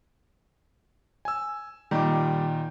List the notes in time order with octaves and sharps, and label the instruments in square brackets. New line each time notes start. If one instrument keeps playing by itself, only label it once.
[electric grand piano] G#5 E6
[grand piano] A#2 D#3 [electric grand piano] G3 D6